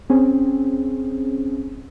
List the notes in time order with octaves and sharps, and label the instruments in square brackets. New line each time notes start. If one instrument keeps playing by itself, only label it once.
[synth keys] C4 C#4 G#4